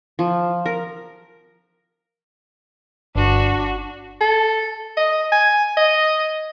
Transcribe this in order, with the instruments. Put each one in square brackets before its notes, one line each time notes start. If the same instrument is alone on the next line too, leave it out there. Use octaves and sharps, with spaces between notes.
[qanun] F3
A#4
[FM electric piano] G1 [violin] D4 F#4
[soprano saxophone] A4
D#5
G#5
D#5